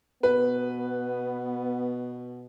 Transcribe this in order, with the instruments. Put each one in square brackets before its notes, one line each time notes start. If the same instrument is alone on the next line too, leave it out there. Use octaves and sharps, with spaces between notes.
[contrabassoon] B2 [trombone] B3 [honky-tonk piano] B4